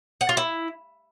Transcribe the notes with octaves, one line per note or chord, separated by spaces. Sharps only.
F#5
F4
E4